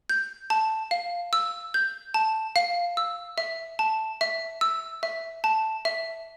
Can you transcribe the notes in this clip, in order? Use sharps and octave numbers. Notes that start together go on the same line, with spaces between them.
G6
A5
F5
E6
G6
A5
F5
E6
E5
A5
E5
E6
E5
A5
E5